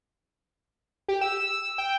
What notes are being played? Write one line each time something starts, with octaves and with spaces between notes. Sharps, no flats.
G4
E6
G5